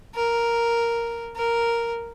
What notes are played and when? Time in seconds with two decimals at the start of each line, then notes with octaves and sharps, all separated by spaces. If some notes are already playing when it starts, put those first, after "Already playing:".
0.15 A#4
1.36 A#4